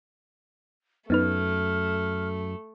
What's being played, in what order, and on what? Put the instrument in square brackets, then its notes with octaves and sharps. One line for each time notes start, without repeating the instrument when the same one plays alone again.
[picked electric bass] F#2 [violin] A3 [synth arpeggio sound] B3 D#4 B4 [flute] F6